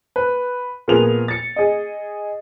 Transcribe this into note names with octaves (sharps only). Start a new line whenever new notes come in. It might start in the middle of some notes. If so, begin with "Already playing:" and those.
B4
A#2 F3 A#3 B3 G#4 F7
A6 C#7
G#4 D#5